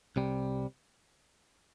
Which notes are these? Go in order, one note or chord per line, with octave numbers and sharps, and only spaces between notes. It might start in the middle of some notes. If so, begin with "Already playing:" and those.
C2 C3 G3